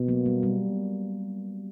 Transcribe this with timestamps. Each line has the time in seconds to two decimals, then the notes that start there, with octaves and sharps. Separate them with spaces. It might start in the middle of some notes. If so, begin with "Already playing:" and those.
Already playing: B2
0.08 F#3 A#3
0.26 G3 B3
0.43 G3